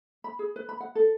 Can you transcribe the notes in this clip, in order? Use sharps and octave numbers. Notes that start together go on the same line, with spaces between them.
B5
G#4
B4
B5
F#5
A4